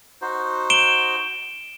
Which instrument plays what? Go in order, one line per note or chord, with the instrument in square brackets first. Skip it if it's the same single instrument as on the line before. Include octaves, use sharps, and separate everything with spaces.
[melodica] D#4 F#4 C5
[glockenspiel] D7 E7 G7